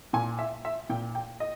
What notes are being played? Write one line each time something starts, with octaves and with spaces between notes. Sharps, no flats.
A#2 G#5
E5
E5
A#2 G5
G5
D#5